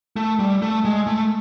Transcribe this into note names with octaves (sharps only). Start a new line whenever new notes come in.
A3
G3
A3
G#3
A3